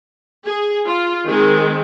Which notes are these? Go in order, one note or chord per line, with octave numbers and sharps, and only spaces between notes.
G#4
F4
D#3 G#3 C4 G#4